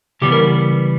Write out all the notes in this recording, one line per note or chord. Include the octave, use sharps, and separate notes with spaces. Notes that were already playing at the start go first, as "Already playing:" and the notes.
C#3 E3 G3 B3 G4
A#4